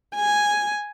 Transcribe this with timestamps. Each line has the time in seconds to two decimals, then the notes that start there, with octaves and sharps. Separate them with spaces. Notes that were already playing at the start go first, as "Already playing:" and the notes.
0.15 G#5